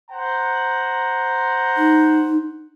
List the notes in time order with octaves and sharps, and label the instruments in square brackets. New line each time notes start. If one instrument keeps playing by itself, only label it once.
[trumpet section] C5 F#5 A#5
[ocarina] D#4